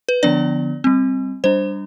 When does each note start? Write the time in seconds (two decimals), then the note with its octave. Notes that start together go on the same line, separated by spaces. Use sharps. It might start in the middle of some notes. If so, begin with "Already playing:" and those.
0.09 B4
0.23 D3 F3 B3 D4 D5
0.84 G3 C4
1.44 G3 D4 C5